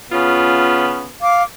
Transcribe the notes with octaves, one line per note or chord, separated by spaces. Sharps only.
C#3 B3 C#4 F4
F5 D6